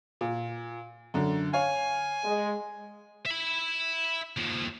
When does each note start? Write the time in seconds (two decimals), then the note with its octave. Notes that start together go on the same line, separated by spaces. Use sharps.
0.21 A#2
1.14 F#2 D3
1.53 C#5 F5 G#5
2.25 G#3
3.26 E5 B5
4.37 D#2 F3